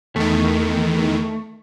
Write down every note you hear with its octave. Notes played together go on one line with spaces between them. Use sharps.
E2 D#3 A3